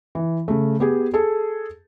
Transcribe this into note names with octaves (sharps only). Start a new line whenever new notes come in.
E3
C#3 A3
B3 G4 G#4
G#4 A4